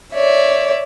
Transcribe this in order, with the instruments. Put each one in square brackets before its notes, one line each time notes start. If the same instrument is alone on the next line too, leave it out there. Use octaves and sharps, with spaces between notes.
[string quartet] C#5 D5 E5